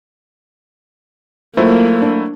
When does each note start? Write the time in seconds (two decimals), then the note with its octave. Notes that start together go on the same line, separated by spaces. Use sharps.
1.57 F#3 A3 A#3 E4 F4 C5
2.02 D4